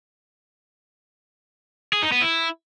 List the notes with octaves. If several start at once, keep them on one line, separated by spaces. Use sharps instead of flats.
G#4
D#4
B3
E4